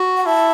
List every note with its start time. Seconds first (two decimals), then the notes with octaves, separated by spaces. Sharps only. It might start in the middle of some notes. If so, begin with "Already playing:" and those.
Already playing: F#4
0.17 F#5
0.26 E4 A5